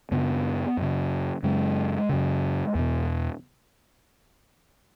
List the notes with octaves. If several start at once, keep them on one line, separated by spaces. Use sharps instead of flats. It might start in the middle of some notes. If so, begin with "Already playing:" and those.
F#2 C#3 B3
F#2 C#3
F#2 C#3 G#3
F#2 C#3
E2 B2